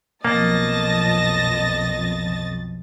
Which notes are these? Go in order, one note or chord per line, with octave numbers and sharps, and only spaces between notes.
B1 F2 A#3 D#5 A5 A6 A#6